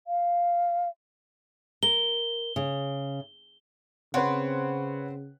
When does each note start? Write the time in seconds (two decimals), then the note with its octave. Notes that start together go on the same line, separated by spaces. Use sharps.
0.07 F5
1.83 A#4 G7
2.56 C#3
4.14 C#3 C4 B4 C#5 F#5